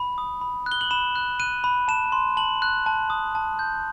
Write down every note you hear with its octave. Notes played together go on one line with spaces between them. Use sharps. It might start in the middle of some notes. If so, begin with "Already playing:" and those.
Already playing: B5
D#6
B5
F#6
G7
F#7
B5 E7
F#6
F#6 D#7
B5
A5 E7
C6
A5 F#7
F#6
A5
D#6
A5
G6